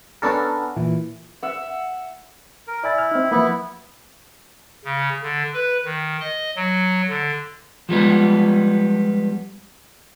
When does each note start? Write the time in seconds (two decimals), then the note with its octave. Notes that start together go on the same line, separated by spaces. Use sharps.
0.22 B3 C#4 D4 A4 A#4
0.76 A#2 E3
1.43 E5 F#5
2.67 A#4
2.83 E4 D5 G#5 A6
2.98 F6
3.12 C4 D#4
3.32 F3 A#3 B3 E4
4.84 C#3
5.22 D3
5.54 B4
5.85 D#3
6.20 D#5
6.56 F#3
7.09 D3
7.89 F3 G3 G#3 B3